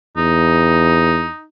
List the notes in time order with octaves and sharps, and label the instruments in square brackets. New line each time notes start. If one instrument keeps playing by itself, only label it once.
[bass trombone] E2 [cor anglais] D#4